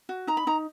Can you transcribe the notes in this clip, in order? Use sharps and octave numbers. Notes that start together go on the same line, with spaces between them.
F#4
D#4 A#5
B5
D#4 A#5